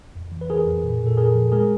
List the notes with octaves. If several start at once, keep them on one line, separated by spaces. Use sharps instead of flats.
F2
E3
B4
E3 G#4 A#4
F2
A#2
A#2
A4
A#2 G#4 A#4
F3
G#3 G#4 A#4